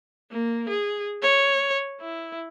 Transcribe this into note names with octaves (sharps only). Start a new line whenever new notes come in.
A#3
G#4
C#5
E4